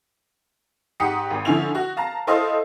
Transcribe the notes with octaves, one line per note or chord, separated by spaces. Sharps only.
G#2 G4 F#5 D#6 C#7
G#1
D3 F3 C#4 E4 F7
F#4
F5 A5 A#5
E4 A4 C5 D#5 F5